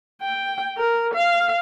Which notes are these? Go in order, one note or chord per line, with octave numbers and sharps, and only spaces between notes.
G5
A#4
F5